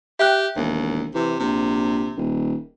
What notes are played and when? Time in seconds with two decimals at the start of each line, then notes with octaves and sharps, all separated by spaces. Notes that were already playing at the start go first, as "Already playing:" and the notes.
0.19 G4 E5 G5 F#6
0.56 E1 D#2
1.15 C3 E3
1.40 A#1 C3
2.17 D#1